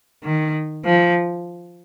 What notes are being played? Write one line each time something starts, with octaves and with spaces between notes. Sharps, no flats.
D#3
F3